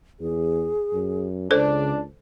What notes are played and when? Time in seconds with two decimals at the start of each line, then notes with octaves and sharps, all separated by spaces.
0.20 E2 G#4
0.93 F#2
1.51 C#2 C#3 D4 A4 C5